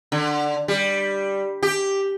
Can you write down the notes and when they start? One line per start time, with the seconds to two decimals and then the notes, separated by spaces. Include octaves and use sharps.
0.12 D3
0.68 G3
1.63 G4